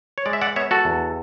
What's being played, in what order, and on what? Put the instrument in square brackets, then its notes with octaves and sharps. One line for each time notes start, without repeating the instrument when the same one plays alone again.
[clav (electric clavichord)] C#5
G#3 D5
E5
D5 F#5
B3 C#5 E5
F#4 A4
E2